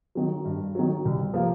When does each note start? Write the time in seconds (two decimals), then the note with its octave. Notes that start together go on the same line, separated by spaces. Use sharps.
0.15 D#3 F#3
0.45 G2
0.75 D#3 F#3
1.05 C2
1.34 C3 F3 A#3